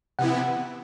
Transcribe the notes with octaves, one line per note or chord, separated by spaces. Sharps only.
C3 E3 B3 E4 F#5